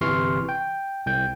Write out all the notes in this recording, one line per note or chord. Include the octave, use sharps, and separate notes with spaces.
G1 C3 E3 C6 C#6 F6
G5
C2 G5 G6